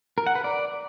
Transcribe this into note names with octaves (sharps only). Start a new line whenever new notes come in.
A#4
F#5
B4
D5